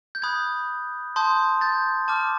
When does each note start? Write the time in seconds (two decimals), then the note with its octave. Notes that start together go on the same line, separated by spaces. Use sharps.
0.15 G6
0.22 B5 D#6 F#6 G#6
1.16 A5 C6 D#6 G6
1.61 G6 A6
2.08 A5 D6 F6